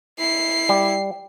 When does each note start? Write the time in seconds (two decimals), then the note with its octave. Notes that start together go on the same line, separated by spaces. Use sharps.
0.20 E4 C7
0.69 G3